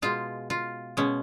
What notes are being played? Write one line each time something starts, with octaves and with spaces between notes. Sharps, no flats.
B2 G#3 F4
F4
B2 G#3 C#4